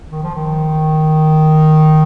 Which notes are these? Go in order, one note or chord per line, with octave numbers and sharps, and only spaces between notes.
D#3
F3
D#3